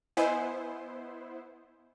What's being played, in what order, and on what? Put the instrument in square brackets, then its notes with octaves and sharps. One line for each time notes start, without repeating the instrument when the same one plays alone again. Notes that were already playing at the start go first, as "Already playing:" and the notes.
[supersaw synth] B3 E4 C5 [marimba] D#5 G#5